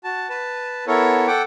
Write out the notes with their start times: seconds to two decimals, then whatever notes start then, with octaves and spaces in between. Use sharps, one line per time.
0.04 F#4 A5
0.30 B4 A5
0.87 B3 E4 A4 A#4 C#5
1.27 A4 F#5 G5 D6